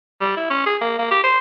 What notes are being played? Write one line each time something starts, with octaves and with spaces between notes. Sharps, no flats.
G3
E4
C#4
G#4
A#3
A#3
G4
C5